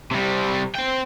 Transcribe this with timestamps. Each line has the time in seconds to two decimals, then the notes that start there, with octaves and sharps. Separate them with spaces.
0.12 C3 G3
0.75 C4 G5